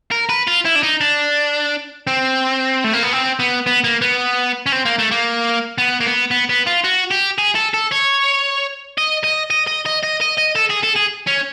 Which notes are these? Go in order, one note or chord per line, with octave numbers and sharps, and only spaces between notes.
A#4
B4
F4
E4
D4
D#4
D4
C4
A3
A#3
B3
C4
B3
B3
A#3
B3
C#4
C4
A#3
A3
A#3
B3
A#3
B3
B3
B3
F4
F#4
G4
G#4
A4
A4
C#5
D#5
D#5
D#5
D#5
D#5
D#5
D#5
D#5
A4
G#4
A4
G#4
C#4